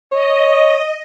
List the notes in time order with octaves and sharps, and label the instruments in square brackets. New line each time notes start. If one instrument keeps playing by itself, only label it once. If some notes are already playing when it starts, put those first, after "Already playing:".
[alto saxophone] C#5 [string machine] D#5